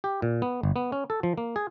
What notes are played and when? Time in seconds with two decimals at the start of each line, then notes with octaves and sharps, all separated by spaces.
0.04 G4
0.22 A#2
0.42 B3
0.63 G1
0.76 B3
0.92 C#4
1.10 A4
1.23 F3
1.38 A#3
1.56 G#4